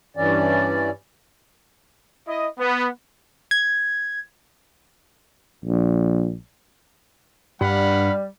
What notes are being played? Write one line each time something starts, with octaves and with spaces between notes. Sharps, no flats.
G2 E3 C#4 D5
E4 D#5
B3
G#6
A#1
G2 G3 F5 F#5 B5